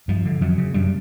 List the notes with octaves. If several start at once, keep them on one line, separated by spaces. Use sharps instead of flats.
G2 F3
D3
F2 F#3
C#3
F#2 G3